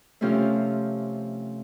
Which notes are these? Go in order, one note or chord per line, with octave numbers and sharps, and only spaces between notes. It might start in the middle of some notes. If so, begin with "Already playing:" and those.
C3 F3 A3 C#4 F4